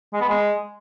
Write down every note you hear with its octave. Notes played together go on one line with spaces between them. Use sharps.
G#3
B3
G#3